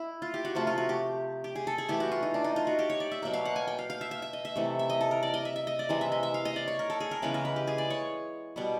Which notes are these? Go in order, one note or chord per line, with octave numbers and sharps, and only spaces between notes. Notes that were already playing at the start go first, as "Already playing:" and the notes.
Already playing: E4
F4
G4
F#4
C3 F3 A3 F4
F4
F#4
G4
G4
G#4
A4
G#4
E3 A3 G4
F#4
F4
D#4
D4
D#4
F4
F#4
G4
C#5
D5
E5
B2 F#3 A#3 E5
F5
F#5
G#5
G5
F5
F5
E5
E5
E5
D#5
E5
C3 E3 A3
E5
D#5
A4
A#4
D5
D#5
E5
E5
D#5
D5
C3 E3 G#3 D#5
E5
D#5
E5
F5
D#5
D5
C#5
A#4
A4
G#4
A#4
C#3 E3 G#3 B3 B4
A#4
B4
G4
G#4
D5
C#5
B2 G3 B3